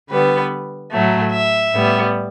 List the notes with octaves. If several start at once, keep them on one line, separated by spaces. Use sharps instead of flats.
D3 G3 B3 B4
A2 F#3 A3
E5
A2 G3 B3